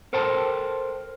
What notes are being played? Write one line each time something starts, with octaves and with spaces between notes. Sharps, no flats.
A4 A#4 C5 G5 A5